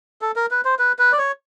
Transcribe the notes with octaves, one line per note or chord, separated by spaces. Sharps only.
A4
A#4
B4
C5
B4
B4
D5
C#5